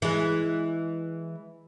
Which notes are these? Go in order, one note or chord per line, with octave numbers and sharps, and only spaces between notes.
E3 G#3